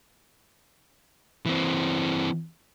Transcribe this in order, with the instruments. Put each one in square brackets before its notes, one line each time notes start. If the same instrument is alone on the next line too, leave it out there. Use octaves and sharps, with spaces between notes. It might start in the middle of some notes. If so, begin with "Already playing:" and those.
[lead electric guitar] E3 C4